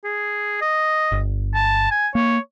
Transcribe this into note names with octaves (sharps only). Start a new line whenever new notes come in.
G#4
D#5
G1
A5
G#5
A#3 C#5